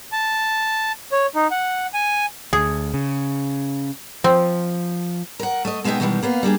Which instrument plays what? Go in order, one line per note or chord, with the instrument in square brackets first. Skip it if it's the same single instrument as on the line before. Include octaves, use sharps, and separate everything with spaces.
[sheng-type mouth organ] A5
C#5
D#4
F#5
G#5
[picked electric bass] D2 [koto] G#4
[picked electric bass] C#3
[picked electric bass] F3 [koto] C4
[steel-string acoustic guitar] A#4 F#5
A3 D#5
B2 G#3 B3 D#4 E5 G5
B2 D#3 E3 G3 G#3
A#3 B3 F5
G3 A#3 D4 G#4